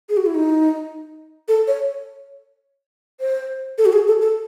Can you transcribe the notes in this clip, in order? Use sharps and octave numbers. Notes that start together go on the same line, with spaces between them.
G#4
F#4
E4
D#4
A4
C#5
C5
A4
F#4
G#4
A4
A4